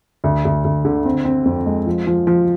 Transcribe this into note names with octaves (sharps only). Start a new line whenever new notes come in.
D2
D2
D2
D3
C4
C4
F2
G#3
F3
F3
F3